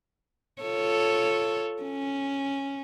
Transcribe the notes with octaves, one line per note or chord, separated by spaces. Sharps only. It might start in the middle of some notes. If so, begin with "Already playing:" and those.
F4 A4 C#5
C#4